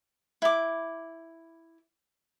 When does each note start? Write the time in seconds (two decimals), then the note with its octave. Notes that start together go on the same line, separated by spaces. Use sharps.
0.42 E4 D6